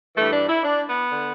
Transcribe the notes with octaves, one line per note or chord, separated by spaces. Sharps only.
G2 E3 A3
D4
E4
D4
B3
D3